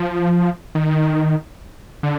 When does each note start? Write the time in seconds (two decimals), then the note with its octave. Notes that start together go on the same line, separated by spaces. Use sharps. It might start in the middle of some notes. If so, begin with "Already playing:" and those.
Already playing: F3
0.75 D#3
2.03 D3